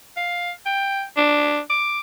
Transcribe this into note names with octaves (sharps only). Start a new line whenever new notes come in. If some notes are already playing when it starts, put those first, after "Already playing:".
F5
G5
D4
D6